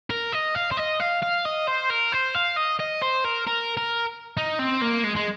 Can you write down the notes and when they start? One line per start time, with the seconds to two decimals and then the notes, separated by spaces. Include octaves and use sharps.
0.10 A#4
0.32 D#5
0.55 F5
0.71 C5
0.77 D#5
1.00 F5
1.22 F5
1.45 D#5
1.67 C5
1.90 A#4
2.12 C5
2.35 F5
2.57 D#5
2.80 D#5
3.02 C5
3.25 A#4
3.47 A#4
3.77 A#4
4.37 D#4
4.59 C4
4.82 A#3
5.05 G#3
5.16 G#3